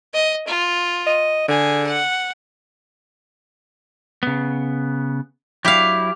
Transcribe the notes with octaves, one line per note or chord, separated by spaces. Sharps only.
D#5
F4
D#5
D3 G#4
F#5
C#3 B3
F#3 E4 G4 F5